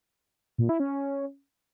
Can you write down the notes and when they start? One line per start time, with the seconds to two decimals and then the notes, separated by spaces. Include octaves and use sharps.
0.58 A#2
0.69 E4
0.80 C#4